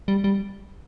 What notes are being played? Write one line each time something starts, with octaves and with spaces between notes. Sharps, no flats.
G3
G3